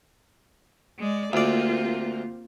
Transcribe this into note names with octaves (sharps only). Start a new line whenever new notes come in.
G#3 D5
D2 A#3 C4 F4 G4 D5